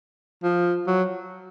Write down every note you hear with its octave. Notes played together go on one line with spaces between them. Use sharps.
F3
F#3